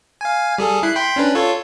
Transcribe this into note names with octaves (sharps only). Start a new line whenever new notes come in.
F5 G#5
G3 G#4 A4
E4 F#6 C7
G5 B5 C6
C#4 D4 B4
F4 A4 C#5